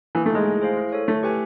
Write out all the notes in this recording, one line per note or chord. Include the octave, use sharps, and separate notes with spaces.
E3 A#3
A3
G#3 D#4 G#4
E4
G#4 C5 F5
E4
A4 C#5
A3 E4
G4 B4 E5 G#5